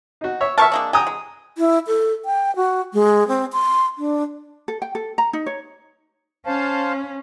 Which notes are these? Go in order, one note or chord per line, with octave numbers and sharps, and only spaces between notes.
D#4 F#4
C#5 E5
B2 A#4 E5 A5 C#6 F6
G#3 A#3 D4
G4 G#5 A#5 D#6
G#3
E4
A4
G5
F#4
G#3
C4
C6
D4
A4
G5
A4
A#5
D#4
C#5
C#4 C5 F5 A5